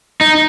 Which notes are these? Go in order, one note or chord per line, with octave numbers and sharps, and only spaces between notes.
D#4